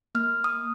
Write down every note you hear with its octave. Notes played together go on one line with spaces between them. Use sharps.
A#3 F6
D#6